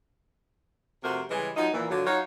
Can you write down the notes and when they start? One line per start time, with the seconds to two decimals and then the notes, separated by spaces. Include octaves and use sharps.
1.03 F2 C3 A3 F#4 A#4 C5
1.29 C#3 E3 G3 G#3
1.56 F3 F#3 A3 D#4
1.72 A#2 E3
1.89 G2 D3 F3 F#3
2.05 F#3 D#4 F4 F#4 C#5 F5